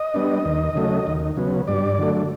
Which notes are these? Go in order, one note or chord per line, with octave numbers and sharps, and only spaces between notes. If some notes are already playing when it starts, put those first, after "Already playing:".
Already playing: D#5
G3 B3 D4
D#2
C#3 F#3 A3
D#2
C#3 F#3 B3
G2 D5
D3 F#3 A3